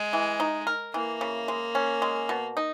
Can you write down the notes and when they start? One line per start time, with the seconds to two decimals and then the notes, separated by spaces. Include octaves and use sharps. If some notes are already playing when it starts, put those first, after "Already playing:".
Already playing: G#3
0.13 E3
0.40 D#4
0.67 A#4
0.94 E3 A#3
1.21 C#3
1.48 G#3
1.75 C#4
2.02 G#3
2.29 B2
2.57 D#4